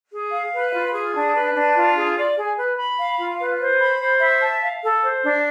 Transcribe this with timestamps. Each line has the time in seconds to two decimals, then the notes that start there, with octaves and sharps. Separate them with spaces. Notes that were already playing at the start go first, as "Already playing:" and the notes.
0.12 G#4
0.32 F5
0.53 B4
0.73 F4
0.94 G#4
1.14 D4
1.34 B4
1.55 D4
1.76 F4
1.96 G#4
2.17 D5
2.36 G#4
2.57 B4
2.78 B5
2.98 F5
3.19 F4
3.39 B4
3.59 C5
3.80 B5
4.00 C5
4.21 E5
4.41 A5
4.62 F5
4.82 A4
5.02 C5
5.23 D4